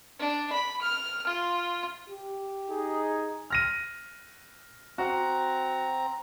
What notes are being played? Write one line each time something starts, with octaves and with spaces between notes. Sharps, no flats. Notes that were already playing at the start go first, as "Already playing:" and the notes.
D4
B5
F6
F4
G4
D#4 G#4
F6 A#6 D#7
C4 F#4 A#5